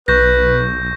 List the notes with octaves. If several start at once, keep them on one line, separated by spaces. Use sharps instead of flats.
B1 B4 C#6 G6 A#6